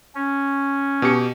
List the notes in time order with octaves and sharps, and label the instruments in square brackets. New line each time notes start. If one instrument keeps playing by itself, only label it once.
[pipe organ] C#4
[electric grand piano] B2 G4 C#7